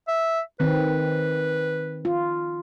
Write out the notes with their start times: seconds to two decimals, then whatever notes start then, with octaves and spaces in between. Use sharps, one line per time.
0.08 E5
0.60 D#3 C4 B4
2.05 F4